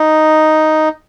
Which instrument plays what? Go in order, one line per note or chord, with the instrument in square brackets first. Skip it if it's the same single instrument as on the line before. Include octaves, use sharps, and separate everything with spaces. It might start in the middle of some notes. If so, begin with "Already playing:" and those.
Already playing: [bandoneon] D#4